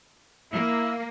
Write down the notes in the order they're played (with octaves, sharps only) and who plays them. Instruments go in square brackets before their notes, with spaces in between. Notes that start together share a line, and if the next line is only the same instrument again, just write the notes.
[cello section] A#3 [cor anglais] E4